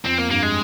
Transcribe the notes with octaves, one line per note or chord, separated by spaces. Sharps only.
F2 C4
A#3
G2 A#3
G#3